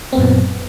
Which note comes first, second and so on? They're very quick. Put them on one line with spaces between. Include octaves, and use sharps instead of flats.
C4 B3 F#2 A#2